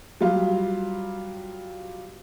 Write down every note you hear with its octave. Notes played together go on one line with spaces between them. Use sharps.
F#3 G3 F4